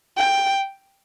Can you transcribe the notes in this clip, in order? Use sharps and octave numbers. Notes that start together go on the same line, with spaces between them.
G5